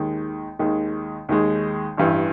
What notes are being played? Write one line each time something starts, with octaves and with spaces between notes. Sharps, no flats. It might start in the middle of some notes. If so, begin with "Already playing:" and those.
Already playing: D#2 D#3 G#3
D#2 D#3 G#3
D#2 D#3 G#3
A1 G2 E3